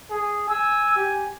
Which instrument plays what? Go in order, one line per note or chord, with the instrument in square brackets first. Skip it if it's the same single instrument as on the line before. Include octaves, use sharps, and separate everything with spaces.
[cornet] G#4
[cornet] G#5 [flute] E6
[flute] G4